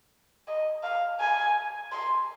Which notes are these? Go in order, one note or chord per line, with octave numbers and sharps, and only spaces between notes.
D#5
F5
G#5
C6